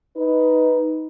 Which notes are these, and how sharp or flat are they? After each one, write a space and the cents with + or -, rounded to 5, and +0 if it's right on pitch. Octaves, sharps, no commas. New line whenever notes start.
D#4 +10 B4 +0